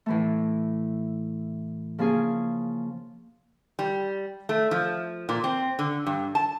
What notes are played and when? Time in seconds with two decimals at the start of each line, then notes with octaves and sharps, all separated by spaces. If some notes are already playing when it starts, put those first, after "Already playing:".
0.06 A2 E3 A3
1.99 C#3 F3 A#3 C#4 G#4
3.79 G3
4.49 A3
4.71 F3
5.29 A#2
5.44 C4
5.79 D3
6.06 G2
6.35 A5